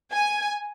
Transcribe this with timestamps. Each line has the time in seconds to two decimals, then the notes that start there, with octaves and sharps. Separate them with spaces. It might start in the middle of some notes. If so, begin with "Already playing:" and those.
0.12 G#5